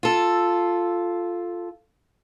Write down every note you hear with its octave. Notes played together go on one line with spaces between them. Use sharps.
F4 A4